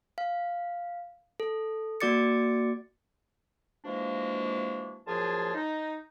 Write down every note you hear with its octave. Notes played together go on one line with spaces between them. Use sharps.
F5
A4
A#3 F#4 D5 D6 A6 C#7
E3 F3 G#3 A#3 D4 F#4
F#2 A#2 F3 F4 G#4 A5
D#4